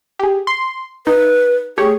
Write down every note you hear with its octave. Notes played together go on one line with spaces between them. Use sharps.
G4 G#4
C6
D#4 B4
A3 G4 G#4 C#5